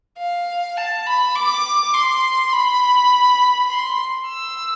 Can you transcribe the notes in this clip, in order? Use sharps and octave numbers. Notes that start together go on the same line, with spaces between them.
F5
A5
B5
D6
C6
B5
C6
E6